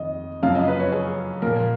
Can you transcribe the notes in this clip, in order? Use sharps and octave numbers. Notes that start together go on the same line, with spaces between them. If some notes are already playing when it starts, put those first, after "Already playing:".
Already playing: F2 D#3 D#5
F#2 C#3 F3 F5
D#5
B4
C#5
G#4
A#2 F3 A#4